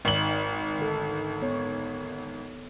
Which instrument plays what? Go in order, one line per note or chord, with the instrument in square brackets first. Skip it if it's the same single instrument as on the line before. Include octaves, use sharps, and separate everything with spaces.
[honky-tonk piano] G#1 F#7 [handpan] D#4
[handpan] D3 A4
B3 C#5